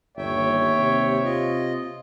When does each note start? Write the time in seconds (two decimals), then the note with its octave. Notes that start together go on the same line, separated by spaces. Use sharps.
0.17 G1 D#2 C#5 E5 G5
0.78 C3
1.24 F4 D#5